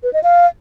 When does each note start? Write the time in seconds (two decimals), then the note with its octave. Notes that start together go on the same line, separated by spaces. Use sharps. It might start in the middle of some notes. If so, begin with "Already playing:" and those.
0.03 B4
0.13 D#5
0.23 F5